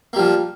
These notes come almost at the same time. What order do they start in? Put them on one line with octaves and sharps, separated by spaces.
A#3 G3 F3